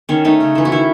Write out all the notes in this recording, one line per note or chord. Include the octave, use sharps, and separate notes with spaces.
D#3 C#4
A3 D#4
C#3
E3 A3
F#4
D#3 E4